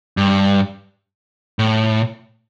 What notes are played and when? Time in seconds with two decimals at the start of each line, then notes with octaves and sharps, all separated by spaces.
0.17 G2
1.59 A2